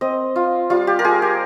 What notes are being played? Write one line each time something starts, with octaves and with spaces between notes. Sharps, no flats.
C4 D#5
F4
G3 F4
G4
A#4
F4 G#4
G4